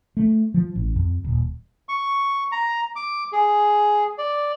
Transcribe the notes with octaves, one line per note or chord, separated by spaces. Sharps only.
A3
F3
A1
F2
D#1
C#6
A#5
D6
G#4
D5